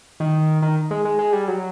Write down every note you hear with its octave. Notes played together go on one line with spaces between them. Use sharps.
D#3
D#3
G#3
G#3
G#3
G3
F#3